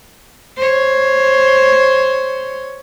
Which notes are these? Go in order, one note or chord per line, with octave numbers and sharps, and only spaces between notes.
C5 C#5